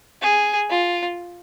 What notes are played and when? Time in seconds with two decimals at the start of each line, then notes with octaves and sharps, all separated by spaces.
0.22 G#4
0.70 F4